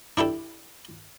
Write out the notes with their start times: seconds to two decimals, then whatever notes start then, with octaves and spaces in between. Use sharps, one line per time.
0.17 D4 E4 G4 A4